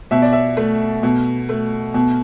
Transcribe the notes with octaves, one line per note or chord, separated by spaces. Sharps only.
B2 E5
D5
E5
A3
B2
A3
B2